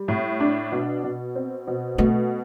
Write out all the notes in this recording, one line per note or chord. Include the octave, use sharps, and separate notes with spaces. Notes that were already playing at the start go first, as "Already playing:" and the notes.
Already playing: G3
A2
D4
B2
B2
C4
B2
B2 A3